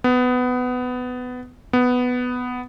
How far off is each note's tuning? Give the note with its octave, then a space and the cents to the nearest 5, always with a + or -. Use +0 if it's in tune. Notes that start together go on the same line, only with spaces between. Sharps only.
B3 +15
B3 +5